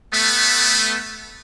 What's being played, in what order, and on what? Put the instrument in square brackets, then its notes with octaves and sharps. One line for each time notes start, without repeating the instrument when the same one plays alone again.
[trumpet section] A3 B3